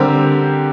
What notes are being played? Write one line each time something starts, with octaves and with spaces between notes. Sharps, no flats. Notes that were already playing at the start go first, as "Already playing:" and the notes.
Already playing: D3 G3 C4 G4 A#4